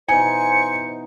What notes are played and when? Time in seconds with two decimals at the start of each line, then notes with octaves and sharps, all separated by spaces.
0.09 B2 E3 D#4 C5 G#5 C#7